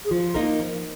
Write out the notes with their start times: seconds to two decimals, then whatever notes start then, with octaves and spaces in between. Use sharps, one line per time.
0.04 G#4
0.11 F3 F4
0.34 A#3 D#4 A#4
0.59 F3